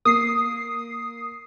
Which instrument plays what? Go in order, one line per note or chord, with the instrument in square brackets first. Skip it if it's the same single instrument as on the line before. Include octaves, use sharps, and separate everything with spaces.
[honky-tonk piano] A#3 [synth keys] D#6 C7